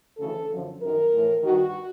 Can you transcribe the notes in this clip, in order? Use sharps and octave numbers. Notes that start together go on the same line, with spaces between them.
D2 C#3 E3 A4
F#2 D3 F3
F#2 D#3 A#4
A2 E3
G2 D#3 F#4